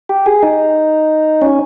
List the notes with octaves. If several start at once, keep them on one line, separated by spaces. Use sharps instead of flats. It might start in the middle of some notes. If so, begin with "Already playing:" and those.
G4
G#4
D#4
C#4